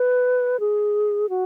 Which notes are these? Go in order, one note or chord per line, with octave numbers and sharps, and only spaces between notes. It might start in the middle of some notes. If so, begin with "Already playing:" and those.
Already playing: B4
G#4
F#4